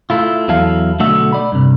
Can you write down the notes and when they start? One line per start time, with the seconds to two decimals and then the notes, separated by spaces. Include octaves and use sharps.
0.10 A3 E4 F4
0.48 E2 F#3 E4 A4 F5
0.99 B1 D3 A3 F#4 E5
1.33 D5 B5
1.52 G2 C3